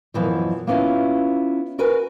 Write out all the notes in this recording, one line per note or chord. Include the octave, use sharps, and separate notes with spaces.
F#2 B2 E3 F3
A#3 B3 C#4 E4 F4
F#4 A#4 B4 G#5